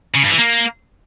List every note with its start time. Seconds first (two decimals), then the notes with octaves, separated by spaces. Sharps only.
0.15 C#3
0.23 G2
0.31 E3
0.39 A#3